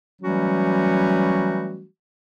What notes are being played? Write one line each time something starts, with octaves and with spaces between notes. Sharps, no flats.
E3 F#3 G3 A3 C#4 F#4